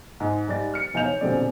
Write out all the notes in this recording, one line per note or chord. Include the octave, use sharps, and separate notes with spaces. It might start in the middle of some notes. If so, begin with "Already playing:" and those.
G#2
G#2 G3 D5 A6
F6 C#7
E1 E2 D#4 F5 G6 F7
C#5
D#1 B2 D3 G#3 C4 D5